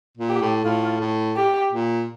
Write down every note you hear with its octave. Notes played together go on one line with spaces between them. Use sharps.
A#2
G4
A2
A2 F4
A2
G4
A#2